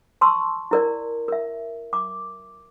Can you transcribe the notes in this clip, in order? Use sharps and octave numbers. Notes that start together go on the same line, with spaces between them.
A5 C6 C#6 E6
E4 A#4 D5
A#4 E5
D6